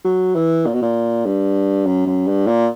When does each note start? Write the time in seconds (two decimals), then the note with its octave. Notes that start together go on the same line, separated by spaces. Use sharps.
0.05 F#3
0.35 E3
0.66 A#2
0.73 B2
0.82 A#2
1.26 G2
1.86 F#2
2.06 F#2
2.27 G2
2.47 A#2